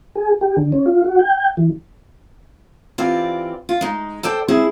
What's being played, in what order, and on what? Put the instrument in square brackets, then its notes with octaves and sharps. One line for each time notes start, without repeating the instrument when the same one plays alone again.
[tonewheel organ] G#4
G4
D3
C#4
F4
F#4
G5
E3
[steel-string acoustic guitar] E3 C4 F4 G4 D5
F4
G#3 D#4
A4 C5 D5 G5
G#3 C4 E4 G#4